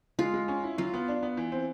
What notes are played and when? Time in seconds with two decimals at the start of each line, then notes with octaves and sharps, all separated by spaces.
0.19 G#3 F4
0.34 G#3
0.48 C#4
0.64 E4
0.78 F#3 F4
0.94 B3
1.08 D4
1.23 B3
1.37 E3
1.52 C4